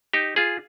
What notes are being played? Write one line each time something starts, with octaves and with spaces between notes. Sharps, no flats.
D#4 G4
F4 G#4